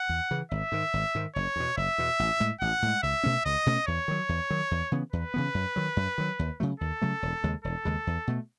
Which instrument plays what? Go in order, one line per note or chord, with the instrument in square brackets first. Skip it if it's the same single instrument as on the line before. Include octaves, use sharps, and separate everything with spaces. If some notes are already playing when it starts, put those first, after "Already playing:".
Already playing: [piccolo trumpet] F#5
[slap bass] E2
C#3 E3
[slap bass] G#1 [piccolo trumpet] E5
[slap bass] G#2 D#3
G#1
G#2 D#3
[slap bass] F#1 [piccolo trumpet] C#5
[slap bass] E2 B2
[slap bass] F#1 [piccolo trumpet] E5
[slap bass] E2 B2
A1
A2 G#3
[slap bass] A1 [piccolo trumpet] F#5
[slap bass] A2 G#3
[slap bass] C#2 [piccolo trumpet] E5
[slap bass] B2 A3 C#4
[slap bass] C#2 [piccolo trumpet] D#5
[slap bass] B2 A3 C#4
[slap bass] E2 [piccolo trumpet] C#5
[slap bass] D#3 F#3
E2
D#3 F#3
E2
C#3 E3 B3
[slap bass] E2 [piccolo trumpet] B4
[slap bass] C#3 E3 B3
F#2
D#3 F#3
F#2
D#3 F#3
D#2
C#3 F#3 A3
[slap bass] D#2 [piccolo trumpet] A4
[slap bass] C#3 F#3 A3
E1
D#2 C#3 G#3
[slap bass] E1 [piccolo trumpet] A4
[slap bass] D#2 C#3 G#3
E2
B2 A3